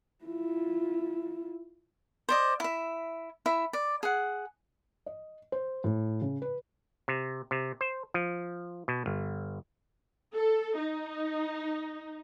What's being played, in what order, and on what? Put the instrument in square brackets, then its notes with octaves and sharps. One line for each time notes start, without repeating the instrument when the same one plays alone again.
[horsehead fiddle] E4 F4
[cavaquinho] C5 D5 D#5
E4 E5
E4 E5
D5
G#4 F#5
[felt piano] D#5
C5
A2
C#3
B4
[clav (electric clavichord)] C3
C3
C5
F3
B2
G1
[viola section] A4
D#4